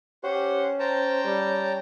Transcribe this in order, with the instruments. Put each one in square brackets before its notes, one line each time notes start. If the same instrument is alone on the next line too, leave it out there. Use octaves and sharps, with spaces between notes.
[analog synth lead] C#4 [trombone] G4 [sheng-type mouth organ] C5 F#5
[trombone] C5 [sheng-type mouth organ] G5 A5 A#5
[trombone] G3